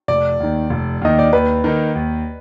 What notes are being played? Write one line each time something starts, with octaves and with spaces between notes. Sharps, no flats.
F1 D5
D#2 D#3
F1
D#2 D#3 D#5
D5
D#2 B4
D#3 A#3 D#4
D#2